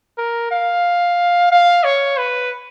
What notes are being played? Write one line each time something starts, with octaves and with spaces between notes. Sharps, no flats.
A#4
F5
F5
C#5
B4